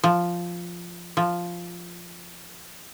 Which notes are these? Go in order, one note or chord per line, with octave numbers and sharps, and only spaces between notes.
F3
F3